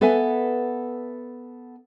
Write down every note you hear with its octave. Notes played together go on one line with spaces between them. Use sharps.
B3 A4 B4 E5 G#5